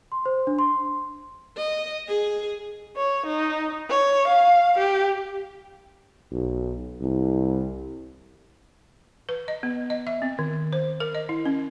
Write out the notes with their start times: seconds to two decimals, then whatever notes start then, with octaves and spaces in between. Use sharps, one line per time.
0.12 C6
0.26 C5
0.47 D4
0.59 C6
1.57 D#5
2.08 G#4
2.96 C#5
3.26 D#4
3.90 C#5
4.28 F5
4.78 G4
6.32 B1
7.01 C2
9.29 B4
9.48 D#5
9.63 B3
9.90 D#5
10.07 E5
10.22 C4
10.39 D#3
10.73 C5
11.00 A#4
11.15 D#5
11.29 E4
11.45 C#4